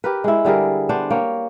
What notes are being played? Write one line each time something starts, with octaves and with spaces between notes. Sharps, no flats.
G4 A#4 B4
G#3 E4
D3 G3 G#4 A#4
B3 D4 C5
A#3 C#5 G5